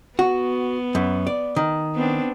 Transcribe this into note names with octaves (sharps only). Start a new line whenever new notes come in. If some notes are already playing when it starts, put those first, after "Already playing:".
B3 F#4
F#2
D5
D#3
B3 C4 D4